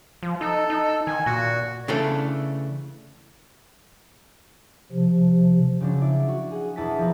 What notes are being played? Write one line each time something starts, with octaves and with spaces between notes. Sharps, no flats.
F3
D#4 A4
D#4
D#3 G#5
A#2 F#4
C#3 E3 A3 D4 A4
C3 F3
C#3 F3 F#3 D4
E4 D5
F#4
G#4 F#5
E1 E2 E4 A5 D#6 B6
F3 B3 A#4 B4